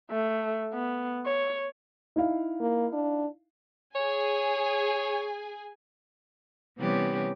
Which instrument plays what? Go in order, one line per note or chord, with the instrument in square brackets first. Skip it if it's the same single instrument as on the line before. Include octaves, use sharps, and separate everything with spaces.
[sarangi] A3
B3
C#5
[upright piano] D#4 E4 F5
[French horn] A#3
D4
[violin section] G#4 G#5 [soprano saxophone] C#5
[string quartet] C3 E3 G3 B3 C#4 G4